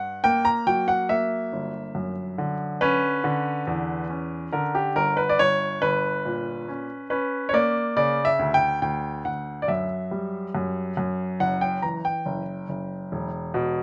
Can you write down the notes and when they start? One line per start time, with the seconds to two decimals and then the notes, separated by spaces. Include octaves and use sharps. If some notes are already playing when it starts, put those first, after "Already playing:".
Already playing: G2 F#5
0.24 A#3 G5
0.45 A#5
0.67 F#3 G5
0.88 F#5
1.09 A#3 E5
1.52 G1
1.95 F#2
2.38 D3
2.81 C#4 B4
3.24 D3
3.67 E2
4.10 C#4
4.52 D3 A#4
4.75 G4
4.95 G1 A#4
5.17 B4
5.29 D5
5.39 G1 C#5
5.82 G1 B4
6.25 A#2
6.68 C#4
7.10 C#4 B4
7.49 C#5
7.53 A#3 D5
7.96 C#3 D5
8.25 E5
8.39 D2
8.54 G5
8.82 D2 G5
9.25 D2 F#5
9.62 D5
9.68 F#2 E5
10.11 G3
10.55 F#2
10.97 F#2
11.40 F#1 F#5
11.61 G5
11.82 E3 A#5
12.05 G5
12.26 F#1
12.69 F#1
13.12 E1
13.54 B2